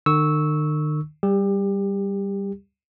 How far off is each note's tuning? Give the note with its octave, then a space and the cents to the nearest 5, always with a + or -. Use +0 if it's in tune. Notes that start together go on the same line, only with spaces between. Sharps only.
D#3 -45 C#6 +0 E6 -15
G3 +0 G4 +25